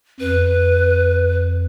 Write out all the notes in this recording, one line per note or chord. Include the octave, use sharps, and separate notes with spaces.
F2 B4